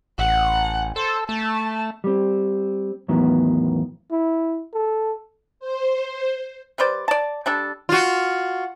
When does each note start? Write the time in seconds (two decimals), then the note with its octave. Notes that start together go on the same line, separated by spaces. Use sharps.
0.18 A1 F#5
0.96 A4 C5
1.29 A3 A5
2.04 G3 C4
3.08 E2 A2 D#3 F#3 B3
4.12 E4
4.73 A4
5.60 C5
6.78 G3 B4 C5 D5
7.08 D5 A5
7.46 G3 D4 A4
7.89 F4 F#4